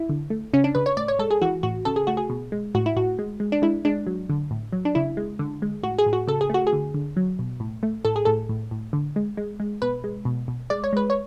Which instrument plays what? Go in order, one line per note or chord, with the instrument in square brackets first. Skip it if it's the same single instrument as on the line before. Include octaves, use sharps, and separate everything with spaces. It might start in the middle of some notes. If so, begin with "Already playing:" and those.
Already playing: [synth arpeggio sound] E4
D3
A3
C#3 C#4
D4
C#3 B4
C#5
A2 D5
C#5
G#3 A4
G#4
E3 F#4
A2 F#4
C#3 A4
G#4
A3 F#4
G#4
B2
G#3
A2 F#4
E4
A2 F#4
G#3
G#3
D4
G#3 E4
G#3 D4
F#3
D3
A2
F#3
D4
C#3 E4
G#3
D3
G#3
A2 F#4
G#4
A2
F#4
C#3 A4
G#4
A3 F#4
G#4
D3
D3
F#3
B2
A2
A3
A2 A4
G#4
A2 A4
A2
A2
D3
G#3
G#3
G#3
B2 B4
G#3
B2
B2
G#3 D5
C#5
G#3 B4
C#5